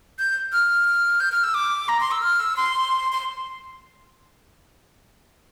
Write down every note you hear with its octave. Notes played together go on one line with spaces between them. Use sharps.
G6
F6
G6
F6
E6
D6
A#5
C6
E6
F6
E6
C6
C6